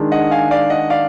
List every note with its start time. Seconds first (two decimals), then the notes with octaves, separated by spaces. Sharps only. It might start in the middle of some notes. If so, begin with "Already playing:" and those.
Already playing: D#3 G#3 D4
0.12 D#5 F#5
0.31 F5 G#5
0.51 D5 F5
0.70 D#5 F#5
0.90 D5 F5